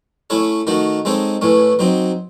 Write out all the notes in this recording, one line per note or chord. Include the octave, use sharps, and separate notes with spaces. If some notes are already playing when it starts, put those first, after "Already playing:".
A3 C#4 E4 A4 C#5
D#3 A3 D#4 F#4
G#3 C4 D#4 A4 C#5
A2 E3 A3 C#4
F#3 C4 D#4